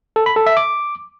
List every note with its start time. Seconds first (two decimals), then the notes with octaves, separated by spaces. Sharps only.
0.16 A4
0.26 B5
0.36 A4
0.46 E5
0.57 D6